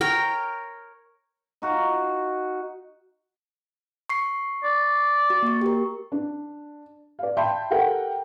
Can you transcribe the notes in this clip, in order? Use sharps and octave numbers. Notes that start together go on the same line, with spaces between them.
A#4 C#5 G5
D#4 F#4 F5 A#5
C#6 C7
D5
F#4
A#3 C#6
G4 A#4
D4
D5 F5
E5 G5 A5 B5 C6 G6
G4 A4 A#4 F#5 G5